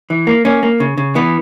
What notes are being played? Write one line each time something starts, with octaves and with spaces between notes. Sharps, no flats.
E3
A#3
A#3 C#4
A#3
C#3
C#3
E3 B3